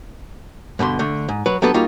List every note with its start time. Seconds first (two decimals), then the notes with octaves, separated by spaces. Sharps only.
0.79 G2 B2 D3 C6
0.99 D3 A3
1.28 G#2
1.46 F#3 B4
1.62 F#3 G3 B3 D4 A4 B4
1.74 G3 A#3 D#4 F4 F#4